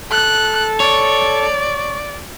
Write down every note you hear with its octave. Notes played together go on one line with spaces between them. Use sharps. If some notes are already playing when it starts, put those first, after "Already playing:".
A4 F#6
C#5 D5